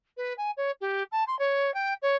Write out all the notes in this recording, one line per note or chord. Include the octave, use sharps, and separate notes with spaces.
B4
G#5
C#5
G4
A5
C6
C#5
G5
C#5